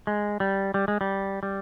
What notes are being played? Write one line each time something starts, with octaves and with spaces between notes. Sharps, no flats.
G#3
G3
G3
G#3
G3
G3